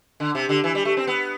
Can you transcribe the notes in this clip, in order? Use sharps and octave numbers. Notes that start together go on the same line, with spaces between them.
D3
C3
D3
E3
G3
A3
C4
B3